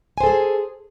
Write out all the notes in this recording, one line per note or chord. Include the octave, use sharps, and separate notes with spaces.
G#4 A4 C5 G#5